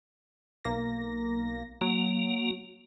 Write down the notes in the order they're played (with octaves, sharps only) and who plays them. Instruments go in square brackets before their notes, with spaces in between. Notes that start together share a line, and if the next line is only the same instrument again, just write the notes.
[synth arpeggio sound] B1 A#3 A#6
[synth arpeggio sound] F#3 [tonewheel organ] A#3